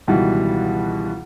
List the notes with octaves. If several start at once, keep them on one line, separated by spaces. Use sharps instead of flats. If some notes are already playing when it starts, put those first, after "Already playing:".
C#2 B2 D#3 E3 G3